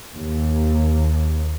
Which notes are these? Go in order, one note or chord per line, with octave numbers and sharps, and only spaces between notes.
D#2